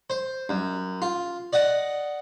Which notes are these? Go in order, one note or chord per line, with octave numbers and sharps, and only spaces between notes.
C5
F#2
F4
D5 D#5 F#5